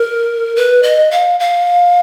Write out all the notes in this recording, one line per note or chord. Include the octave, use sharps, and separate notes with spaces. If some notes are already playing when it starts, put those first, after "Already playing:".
Already playing: A#4
B4
D#5
F5
F5